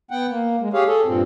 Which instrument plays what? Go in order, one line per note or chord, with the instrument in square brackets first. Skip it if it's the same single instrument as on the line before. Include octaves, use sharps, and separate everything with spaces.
[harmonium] B3 F#5 G5
A#3
G#3
G4 G#4 C#5 F5
G#4 A4
G2 A#2 C4